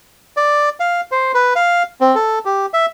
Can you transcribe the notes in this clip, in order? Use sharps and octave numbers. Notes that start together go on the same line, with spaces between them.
D5
F5
C5
B4
F5
C4
A4
G4
E5